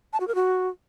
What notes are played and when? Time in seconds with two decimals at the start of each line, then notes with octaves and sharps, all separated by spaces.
0.13 A5
0.20 F#4
0.28 A#4
0.35 F#4